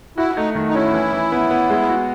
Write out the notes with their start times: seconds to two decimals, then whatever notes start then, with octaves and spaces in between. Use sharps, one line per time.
0.18 E4 F#4
0.37 A3 D#4
0.55 D#3
0.69 D#4
0.75 C#4 E4
0.94 E3
1.13 E3
1.32 B3
1.51 B3
1.70 G#3
1.89 F#4